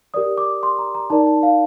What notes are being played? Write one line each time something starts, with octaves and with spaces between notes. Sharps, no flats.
G4 A#4 D5 D#6
D6
C6
A#5
A#5
D#4 A#4 D5 A5
A5
F5